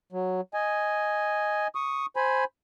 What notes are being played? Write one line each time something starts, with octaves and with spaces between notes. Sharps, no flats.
F#3
D#5 G#5
C#6 D#6
C5 G#5 B5